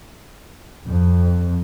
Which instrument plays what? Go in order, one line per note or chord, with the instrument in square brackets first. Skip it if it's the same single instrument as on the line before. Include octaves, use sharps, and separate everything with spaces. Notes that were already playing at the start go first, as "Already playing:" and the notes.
[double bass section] F2